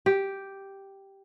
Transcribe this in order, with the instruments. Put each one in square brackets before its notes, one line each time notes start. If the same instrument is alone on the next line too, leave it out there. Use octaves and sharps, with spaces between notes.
[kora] G4